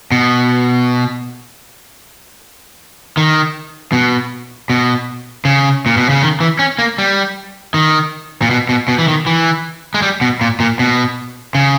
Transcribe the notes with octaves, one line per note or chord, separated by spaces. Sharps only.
B2
D#3
B2
B2
C#3
A#2
B2
C#3
D#3
E3
C#4
A#3
G3
D#3
A#2
B2
B2
B2
E3
D#3
E3
G#3
G3
B2
A#2
A#2
B2
C#3